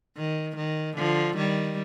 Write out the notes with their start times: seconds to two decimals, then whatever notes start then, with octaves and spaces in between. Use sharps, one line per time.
0.17 D#3
0.57 D#3
0.97 D3 F3
1.37 D#3 G3